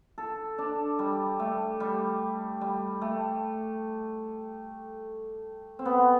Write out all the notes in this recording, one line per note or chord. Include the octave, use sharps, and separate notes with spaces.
A4
D4
G3
A3
G3
G3
A3
C4
B3